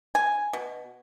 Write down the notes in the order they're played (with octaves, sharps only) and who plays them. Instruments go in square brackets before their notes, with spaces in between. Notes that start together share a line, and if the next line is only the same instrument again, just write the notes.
[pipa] G#5
B2